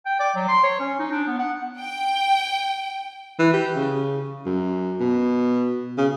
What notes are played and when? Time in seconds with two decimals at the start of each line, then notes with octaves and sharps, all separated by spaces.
0.06 G5
0.20 D5
0.36 F#3
0.48 C6
0.63 C#5
0.80 C#4
0.99 D#4
1.11 D4
1.27 B3
1.39 F#5
1.80 G5
3.39 E3
3.54 G4
3.76 C#3
4.46 F#2
5.00 B2
5.98 C#3